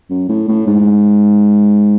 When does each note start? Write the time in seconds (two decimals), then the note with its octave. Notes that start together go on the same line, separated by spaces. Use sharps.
0.10 F#2
0.29 A2
0.48 A2
0.67 G#2